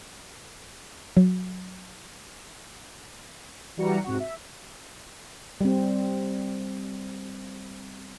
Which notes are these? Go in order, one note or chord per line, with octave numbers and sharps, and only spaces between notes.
F#3
E3 G3 F#4 A#5 C#7
G#2 C3 F#4 F#5
E5
G3 C4